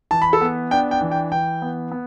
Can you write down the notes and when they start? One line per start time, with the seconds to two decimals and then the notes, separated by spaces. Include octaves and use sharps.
0.11 E3 A5
0.22 B5
0.33 A4 A5
0.41 B3
0.71 D4 G5
0.91 G5
1.01 E3
1.11 G5
1.32 E3 G5
1.62 B3
1.92 B3